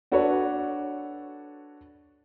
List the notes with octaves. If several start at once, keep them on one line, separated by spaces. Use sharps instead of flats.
D4 F#4 A4 B4 C#5 D5